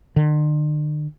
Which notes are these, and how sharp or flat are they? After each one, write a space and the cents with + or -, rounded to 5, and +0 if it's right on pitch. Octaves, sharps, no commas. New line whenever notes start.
D3 +45